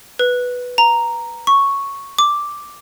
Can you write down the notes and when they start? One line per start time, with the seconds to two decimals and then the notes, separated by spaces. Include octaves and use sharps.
0.19 B4
0.78 A#5
1.47 C#6
2.19 D6